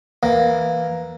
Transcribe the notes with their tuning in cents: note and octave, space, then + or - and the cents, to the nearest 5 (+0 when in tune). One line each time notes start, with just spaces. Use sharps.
E3 +0 A#3 +5